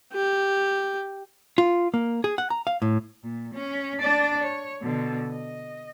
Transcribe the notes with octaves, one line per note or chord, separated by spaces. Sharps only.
G4
F4
A#3
G#4
F#5
A#5
F5
A2
A#2
C#4
D4 D5
C#5
B2 D3
D#5